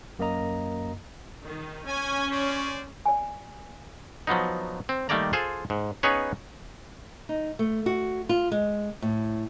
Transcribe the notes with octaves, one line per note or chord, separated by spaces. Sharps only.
F#2 A#3 A#4 D#5 A#5
D#3
C#4 G#5
G#4 C5 D5
D5 G#5
F3 F#3 B3 D#4
C4
D#3 G3 A3 A#3 D5 A#5
F4 G#4 A4 C5
G#2
B3 C#4 D#4 G#4 B4 C#5
D#4
A3
F#4
F4
G#3
A2